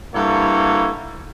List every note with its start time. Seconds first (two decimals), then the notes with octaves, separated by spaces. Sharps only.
0.14 G2 A#3 E4 A4 C#5 F#5